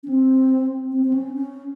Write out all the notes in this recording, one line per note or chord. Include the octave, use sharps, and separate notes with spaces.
C#4
C4
C4
C4
C#4
C#4